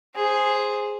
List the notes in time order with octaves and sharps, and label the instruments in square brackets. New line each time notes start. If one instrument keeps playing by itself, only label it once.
[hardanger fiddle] G#4 C5